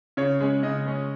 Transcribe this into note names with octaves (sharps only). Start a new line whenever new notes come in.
C#3 C#5
G#3 C#4
C#3 D#5
G#3 C#4